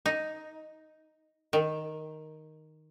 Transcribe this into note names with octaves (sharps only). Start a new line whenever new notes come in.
D#4
D#3